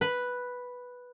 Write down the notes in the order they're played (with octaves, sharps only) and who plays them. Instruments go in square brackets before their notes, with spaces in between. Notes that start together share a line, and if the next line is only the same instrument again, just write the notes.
[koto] B4